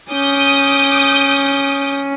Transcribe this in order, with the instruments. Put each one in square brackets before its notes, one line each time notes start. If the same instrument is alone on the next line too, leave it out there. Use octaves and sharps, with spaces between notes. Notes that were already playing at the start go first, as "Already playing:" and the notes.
[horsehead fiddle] C#4 [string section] D6 D#6 G6